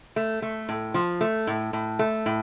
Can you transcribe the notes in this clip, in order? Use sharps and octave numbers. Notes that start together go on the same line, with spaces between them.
A3
A3
A2
F3
A3
A2
A2
A3
A2